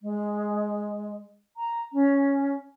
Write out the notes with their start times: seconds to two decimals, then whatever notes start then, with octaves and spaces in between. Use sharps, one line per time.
0.01 G#3
1.57 A#5
1.93 C#4